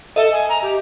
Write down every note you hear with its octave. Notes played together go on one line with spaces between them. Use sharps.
A4 D#5 E5
G#5
A#5
G4